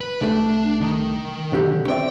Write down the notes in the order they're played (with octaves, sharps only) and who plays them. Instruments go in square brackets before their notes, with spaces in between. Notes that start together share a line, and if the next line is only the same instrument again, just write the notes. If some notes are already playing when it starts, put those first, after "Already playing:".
[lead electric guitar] B4
[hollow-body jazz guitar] C2 A3 [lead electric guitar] D4
[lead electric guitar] D#3
[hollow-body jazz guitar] B1 D3 G4
[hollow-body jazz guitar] C4 D5 E5 [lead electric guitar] G5